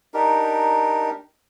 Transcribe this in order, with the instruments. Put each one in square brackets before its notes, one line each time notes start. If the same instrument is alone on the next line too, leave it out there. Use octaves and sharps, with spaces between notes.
[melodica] D4 D#4 G4 A#4